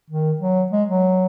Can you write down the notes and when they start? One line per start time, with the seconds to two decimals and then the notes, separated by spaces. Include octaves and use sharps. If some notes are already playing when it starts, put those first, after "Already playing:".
0.10 D#3
0.41 F#3
0.72 G#3
0.88 F#3